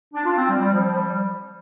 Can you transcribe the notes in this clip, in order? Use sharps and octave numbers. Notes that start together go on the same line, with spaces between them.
D4
F4
C4
G3
G3
F3
F3
G3